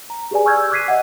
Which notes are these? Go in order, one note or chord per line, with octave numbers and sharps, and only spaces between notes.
A#5
G4 G#4 B4 D5 G#5
G#5 C#6 E6 F6 G6 G#6
E6
D6 F#6 G#6 B6 C7 D#7
D#5 E5 F#5